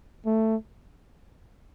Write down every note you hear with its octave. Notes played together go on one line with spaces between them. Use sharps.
A3